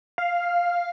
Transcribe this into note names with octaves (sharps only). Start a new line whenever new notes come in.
F5